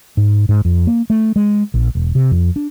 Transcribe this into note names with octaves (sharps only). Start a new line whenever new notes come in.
G#2
G#2
F2
A#3
A3
G#3
A#1
E1
C3
F2
D4